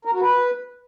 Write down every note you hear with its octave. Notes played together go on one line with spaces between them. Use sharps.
A#4
F#4
B4